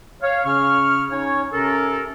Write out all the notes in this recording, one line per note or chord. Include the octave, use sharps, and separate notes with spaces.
C#5 F5
C#3 C#4 C#6 F6
C#4 D#4 C#5
C3 C#4 A4 A#4